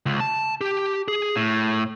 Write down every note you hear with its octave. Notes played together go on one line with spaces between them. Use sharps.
C#2
A5
G4
G#4
A2